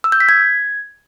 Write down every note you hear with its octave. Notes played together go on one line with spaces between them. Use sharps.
E6
G6
B6
G#6